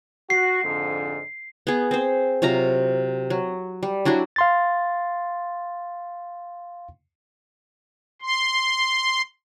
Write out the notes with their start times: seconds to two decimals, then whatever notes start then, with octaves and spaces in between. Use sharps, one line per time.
0.30 F#4 C7
0.63 F2 G#2 D3
1.67 B3 G#4
1.91 C4 C5
2.42 C3 F#3 F4 A#5
3.30 F#3
3.83 G3
4.05 F#3 D4 E4 F#4
4.36 F5 C6 A6
8.22 C6